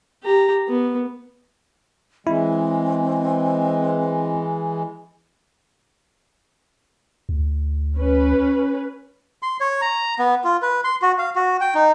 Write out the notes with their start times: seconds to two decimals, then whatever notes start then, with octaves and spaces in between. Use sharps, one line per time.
0.23 G4 A#5
0.68 B3
2.27 E3 G#3 C4 E4
7.29 D2
7.98 C#4 B4
9.43 C6
9.60 C#5
9.81 A#5
10.19 B3
10.44 F4
10.62 B4
10.84 C6
11.02 F#4
11.18 F5
11.35 F#4
11.61 G5
11.75 D#4